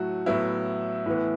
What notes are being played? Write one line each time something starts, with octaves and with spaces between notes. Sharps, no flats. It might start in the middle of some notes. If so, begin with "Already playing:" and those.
Already playing: A2 F#3 A3 F#4
A2 F#3 B3 E4
A2 E3 B3